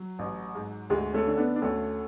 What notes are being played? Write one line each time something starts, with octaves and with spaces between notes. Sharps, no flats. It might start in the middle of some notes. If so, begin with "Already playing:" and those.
Already playing: F#3
A1
G#2
D2 G#3
A3 C#4
D3
B3 D4
D4
D2 A3 C#4